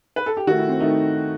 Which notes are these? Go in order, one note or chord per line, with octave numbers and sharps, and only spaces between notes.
B4
A4
G4
D#3 A3 F#4
E4
C4
D#3 A3 D#4